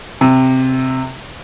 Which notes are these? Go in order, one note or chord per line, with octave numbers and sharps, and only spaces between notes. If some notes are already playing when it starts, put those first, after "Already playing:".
C3